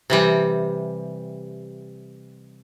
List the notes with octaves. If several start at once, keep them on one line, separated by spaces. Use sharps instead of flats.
C3 E3 G3